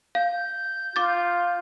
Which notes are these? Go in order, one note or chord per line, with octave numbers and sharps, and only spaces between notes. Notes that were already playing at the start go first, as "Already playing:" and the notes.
F5 G6
F4 D6 A6